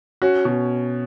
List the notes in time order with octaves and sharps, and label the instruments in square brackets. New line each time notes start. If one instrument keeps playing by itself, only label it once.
[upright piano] C#4 [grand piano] F#4
[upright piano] B2